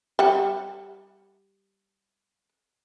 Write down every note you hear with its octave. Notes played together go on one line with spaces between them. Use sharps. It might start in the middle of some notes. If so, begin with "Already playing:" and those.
G3 F#5